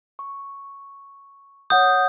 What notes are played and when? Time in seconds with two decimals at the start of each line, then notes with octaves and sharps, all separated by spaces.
0.19 C#6
1.70 C#5 F#5 D#6 G6